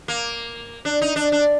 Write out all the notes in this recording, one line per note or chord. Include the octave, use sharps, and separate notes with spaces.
A#3
D4
D#4
D4
D4